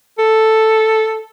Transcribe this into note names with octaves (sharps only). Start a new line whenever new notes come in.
A4